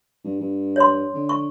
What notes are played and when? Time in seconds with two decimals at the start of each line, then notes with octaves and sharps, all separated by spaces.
0.24 G2
0.40 G2
0.76 C#5 C6
1.14 D3
1.29 C#6